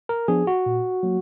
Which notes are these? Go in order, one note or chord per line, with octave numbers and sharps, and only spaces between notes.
A#4
F3 B3 D4 G#4
F#4
A#2
F#3 A#3